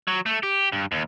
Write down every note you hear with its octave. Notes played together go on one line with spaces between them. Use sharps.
F#3
A3
G4
G2
D#2